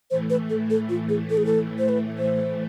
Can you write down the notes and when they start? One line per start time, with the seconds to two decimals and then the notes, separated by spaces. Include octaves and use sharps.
0.10 A2 E3 A3 C5
0.30 B4
0.50 A4
0.70 A4
0.89 F4
1.09 G#4
1.30 A4
1.37 G#4
1.46 A4
1.79 C5
1.89 B4
2.18 C5